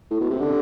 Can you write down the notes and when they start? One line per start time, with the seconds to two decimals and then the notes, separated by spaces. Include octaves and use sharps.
0.11 A2
0.20 B2
0.30 C3
0.40 D3